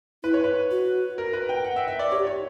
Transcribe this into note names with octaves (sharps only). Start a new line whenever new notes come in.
E4 B4
C#5
B4
F#4
A#4
B4
G5
F#5
E5
E5
D5
G4 C#5
C#5